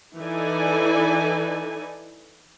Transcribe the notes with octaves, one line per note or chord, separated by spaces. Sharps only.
E3 D#4 A4 B4 D5 G#5